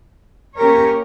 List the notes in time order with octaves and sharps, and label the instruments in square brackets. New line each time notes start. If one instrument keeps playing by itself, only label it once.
[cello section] A#3 C#4 G4 A#4 C#5